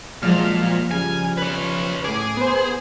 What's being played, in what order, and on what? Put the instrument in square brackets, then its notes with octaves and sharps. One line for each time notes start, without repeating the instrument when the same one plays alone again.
[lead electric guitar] A#2 [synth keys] F3 F6 [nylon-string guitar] F#3 G#3
[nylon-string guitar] C#3 G3 [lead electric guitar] G#5
[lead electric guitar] B4 C#5
[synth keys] A2 D6 [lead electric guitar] G#4
[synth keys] B3 C5